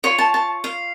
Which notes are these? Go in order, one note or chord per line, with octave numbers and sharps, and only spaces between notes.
F4 C#5 C#6
A5
A5
F5